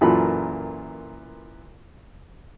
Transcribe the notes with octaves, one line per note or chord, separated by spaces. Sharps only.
F#2 A#2 E3 F4 A4 B5